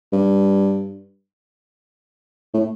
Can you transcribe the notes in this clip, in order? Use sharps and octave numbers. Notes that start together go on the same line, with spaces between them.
G2
A2